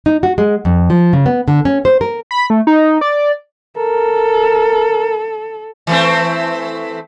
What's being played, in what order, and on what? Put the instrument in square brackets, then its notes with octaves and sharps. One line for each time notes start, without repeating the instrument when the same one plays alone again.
[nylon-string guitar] D#4
F#4
G#3
F2
F3
C#3
B3
D3
C#4
C5
A#4
[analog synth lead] B5
A3
D#4
D5
[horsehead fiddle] A4 [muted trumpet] A#4
[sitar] E3 A3 C4